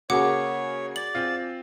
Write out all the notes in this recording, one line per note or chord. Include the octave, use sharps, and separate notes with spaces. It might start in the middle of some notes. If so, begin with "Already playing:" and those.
C#3 A#3 F#4 G#4 C#5 F#5 D6
D5 F#7
C4 F4